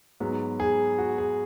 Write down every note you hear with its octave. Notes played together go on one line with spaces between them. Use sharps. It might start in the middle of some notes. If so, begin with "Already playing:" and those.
G#2 F#3 B3
G#4
F#4
G#4